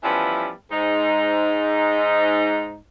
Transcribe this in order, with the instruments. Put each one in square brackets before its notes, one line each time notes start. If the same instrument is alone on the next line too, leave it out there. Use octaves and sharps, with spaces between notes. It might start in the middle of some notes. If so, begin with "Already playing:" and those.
[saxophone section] E3 F3 G3 B3 C#4 E4
G#2 D#4